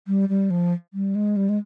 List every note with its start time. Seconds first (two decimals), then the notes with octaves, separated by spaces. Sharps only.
0.07 G3
0.29 G3
0.50 F3
0.94 G3
1.15 G#3
1.36 G3
1.49 G#3